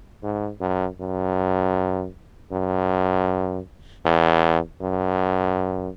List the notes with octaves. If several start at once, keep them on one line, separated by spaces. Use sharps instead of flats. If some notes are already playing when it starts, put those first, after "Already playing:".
G#2
F#2
F#2
F#2
E2
F#2